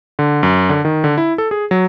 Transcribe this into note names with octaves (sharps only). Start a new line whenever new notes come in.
D3
F#2
D3
D#3
D3
E4
A4
G#4
F#3